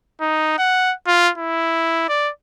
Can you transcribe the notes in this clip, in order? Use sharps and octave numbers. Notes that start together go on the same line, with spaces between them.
D#4
F#5
F4
E4
D5